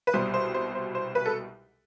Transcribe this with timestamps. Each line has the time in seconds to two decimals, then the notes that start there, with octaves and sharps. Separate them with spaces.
0.07 B4
0.14 C2 B2 G3 C5
0.34 C5
0.54 C5
0.75 C5
0.95 C5
1.15 B4
1.26 A4